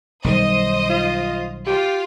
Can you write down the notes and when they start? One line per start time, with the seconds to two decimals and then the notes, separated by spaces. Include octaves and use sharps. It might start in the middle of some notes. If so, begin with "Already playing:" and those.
0.24 B1 D#3 G3 C5 D#5 D#6
0.90 F4
1.67 F4 G4